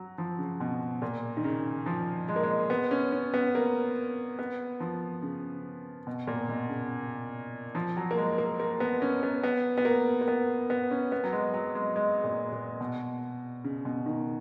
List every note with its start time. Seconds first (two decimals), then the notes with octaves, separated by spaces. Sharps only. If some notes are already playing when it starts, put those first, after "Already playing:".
Already playing: F#3
0.18 F3
0.39 C#3
0.60 B2
1.02 A#2
1.37 D#3
1.44 C#3
1.86 F3
2.28 G#3
2.36 A#3
2.43 G#3
2.70 B3
2.91 C#4
3.12 C#4
3.34 B3
3.55 A#3
4.39 B3
4.80 F3
5.23 C#3
6.07 B2
6.27 A#2
6.49 B2
6.69 C#3
7.75 F3
7.97 F#3
8.11 A#3
8.17 G#3
8.38 A#3
8.60 A#3
8.80 B3
9.02 C#4
9.23 B3
9.44 B3
9.78 B3
9.85 A#3
10.21 A#3
10.28 B3
10.70 B3
10.91 C#4
11.12 B3
11.24 F#3
11.32 G#3
11.54 F#3
11.75 G#3
11.96 G#3
12.24 A#2
12.52 A#2
12.81 B2
13.64 C#3
13.85 B2
14.06 D#3